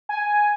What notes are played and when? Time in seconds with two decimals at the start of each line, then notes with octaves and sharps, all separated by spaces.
0.09 G#5